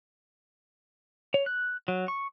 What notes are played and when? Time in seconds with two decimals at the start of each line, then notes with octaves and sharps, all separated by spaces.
1.34 C#5
1.46 F#6
1.88 F#3
2.08 C#6